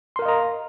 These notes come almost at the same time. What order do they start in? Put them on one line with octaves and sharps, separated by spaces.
C6 A#4 F5 D#5 A#5